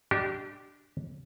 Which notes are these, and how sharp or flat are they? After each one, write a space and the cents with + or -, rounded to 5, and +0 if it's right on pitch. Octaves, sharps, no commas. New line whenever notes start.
D4 +0 G4 -35 D#5 +0